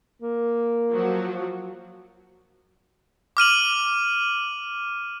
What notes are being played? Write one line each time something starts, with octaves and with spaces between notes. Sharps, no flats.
A#3
F3 F#3 F#4
D6 F6 D#7 F#7